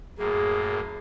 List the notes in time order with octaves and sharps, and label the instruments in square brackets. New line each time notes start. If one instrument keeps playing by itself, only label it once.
[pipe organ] F#2 A2 A#3 [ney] G#4